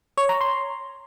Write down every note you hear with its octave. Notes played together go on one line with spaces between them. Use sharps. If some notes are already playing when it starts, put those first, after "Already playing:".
C#5
A#5
C6